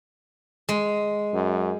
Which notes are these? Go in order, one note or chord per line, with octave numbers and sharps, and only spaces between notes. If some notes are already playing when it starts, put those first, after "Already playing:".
G#3
F#2